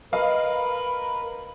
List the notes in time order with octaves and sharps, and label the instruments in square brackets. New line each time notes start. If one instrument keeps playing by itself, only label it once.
[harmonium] A#4 B4 [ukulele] D#5 [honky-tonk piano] F5 [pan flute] B5